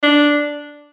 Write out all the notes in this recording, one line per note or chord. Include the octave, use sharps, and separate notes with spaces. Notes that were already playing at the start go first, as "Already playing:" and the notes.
D4